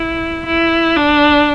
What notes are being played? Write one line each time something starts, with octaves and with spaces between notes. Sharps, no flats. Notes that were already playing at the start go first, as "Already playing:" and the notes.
Already playing: E4
E4
D4